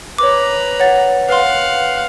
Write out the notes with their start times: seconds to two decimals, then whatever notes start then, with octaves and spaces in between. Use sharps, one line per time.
0.18 B4 C#5 A#5 D6
0.80 C#5 F#5 A6
1.29 B4 F5 F#5 C6